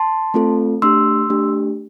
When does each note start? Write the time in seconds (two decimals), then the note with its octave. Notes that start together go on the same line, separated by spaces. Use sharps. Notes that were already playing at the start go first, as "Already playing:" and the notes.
Already playing: A5 C6
0.34 A3 C4 F4 A4
0.82 A3 D4 G4 C6 E6
1.30 A3 D4 G4